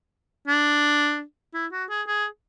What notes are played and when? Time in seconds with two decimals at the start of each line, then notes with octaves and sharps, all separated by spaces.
0.48 D4
1.54 E4
1.72 F#4
1.90 G#4
2.07 G#4